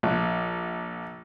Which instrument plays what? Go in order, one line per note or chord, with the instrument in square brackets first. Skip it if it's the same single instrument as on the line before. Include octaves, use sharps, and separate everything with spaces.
[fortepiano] A#1